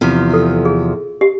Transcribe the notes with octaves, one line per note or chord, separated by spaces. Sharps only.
E2 C3 F3
A4
G#4
G4